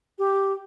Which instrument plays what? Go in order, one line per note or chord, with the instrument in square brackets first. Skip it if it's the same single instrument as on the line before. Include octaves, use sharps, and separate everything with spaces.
[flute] G4